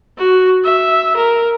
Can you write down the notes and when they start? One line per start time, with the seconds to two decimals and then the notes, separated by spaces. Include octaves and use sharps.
0.18 F#4
0.64 E5
1.16 A#4